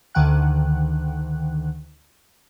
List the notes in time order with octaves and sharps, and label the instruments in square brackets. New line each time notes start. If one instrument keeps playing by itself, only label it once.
[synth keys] D2 D3 D#3 F#5 G5 F#6